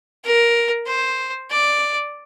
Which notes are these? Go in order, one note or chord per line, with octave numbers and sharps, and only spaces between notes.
A#4
C5
D5